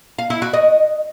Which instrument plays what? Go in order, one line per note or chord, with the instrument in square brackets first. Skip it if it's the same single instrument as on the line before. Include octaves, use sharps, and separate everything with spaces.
[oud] F5
E4
F#4
D#5